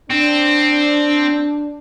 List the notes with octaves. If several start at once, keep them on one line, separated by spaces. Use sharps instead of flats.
C4 D4